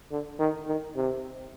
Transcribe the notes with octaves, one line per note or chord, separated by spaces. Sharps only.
D3
D#3
D#3
C3